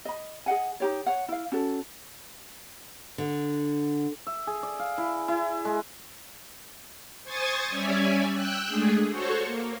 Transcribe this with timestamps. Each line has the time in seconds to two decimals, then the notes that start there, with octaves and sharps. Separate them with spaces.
0.05 D#5 B5
0.46 G#4 D#5 F#5 G#5
0.80 D#4 G4 C#5
1.06 C#5 F#5
1.28 E4 F5
1.52 C#4 F#4 A4
3.18 D3
4.27 E5
4.47 G#4
4.63 D5
4.79 F5
4.98 E4
5.28 E4
5.65 G#3
7.23 C5 G#5 C#6 D#6 G#6 A6
7.69 G3 C#4 C#5 D5 E5 G#5
8.32 G5 E6 F#6
8.68 G#3 A3 D4 G#4
9.09 F#4 A4 C5 C#5 C#6
9.44 A#3